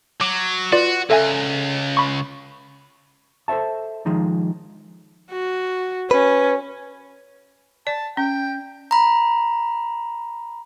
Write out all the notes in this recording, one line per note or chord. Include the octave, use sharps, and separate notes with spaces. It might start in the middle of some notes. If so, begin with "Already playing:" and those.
F#3 D6
F4 F#4 B4 D5
C#2 A4 E5 G#5
B5 C#6
A4 C5 C#5 E5 A5
D#3 F3 G#3 D#4
F#4
C#4 B4
D5 A5
C#4 G5
A#5 B5